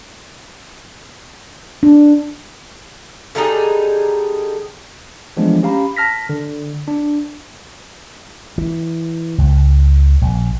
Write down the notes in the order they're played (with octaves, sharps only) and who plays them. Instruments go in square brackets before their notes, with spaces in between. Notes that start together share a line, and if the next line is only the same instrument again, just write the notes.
[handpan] D4
[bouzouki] D3 G3 D#4 G#4
[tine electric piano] E3 F3 G#3 A3 B3 D4
C#4 G4 F5 A#5 B5
A5 F6 A#6 B6
D3
D4
[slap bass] E3
C#2
A#1